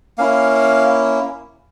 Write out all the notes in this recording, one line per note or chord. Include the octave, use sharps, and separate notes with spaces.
A#3 C#4 E4 F5